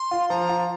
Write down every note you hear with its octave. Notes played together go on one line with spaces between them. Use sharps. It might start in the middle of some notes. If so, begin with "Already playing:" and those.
Already playing: C6
F4
F3 A#5
F4